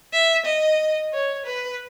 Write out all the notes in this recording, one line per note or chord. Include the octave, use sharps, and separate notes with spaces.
E5
D#5
C#5
B4